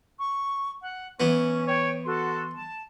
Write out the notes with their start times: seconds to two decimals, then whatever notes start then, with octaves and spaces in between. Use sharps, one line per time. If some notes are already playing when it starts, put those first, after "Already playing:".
0.19 C#6
0.82 F#5
1.20 E3 B3 C#4 C#6
1.68 C#5 G5
2.06 F#4 A4 C6
2.54 A5